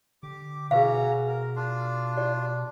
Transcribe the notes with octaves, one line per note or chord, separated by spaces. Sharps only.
D3 G4 D6
B2 C#4 F#4 G#4 B4 F5 A#5
A#4
D4 F4
G4 D5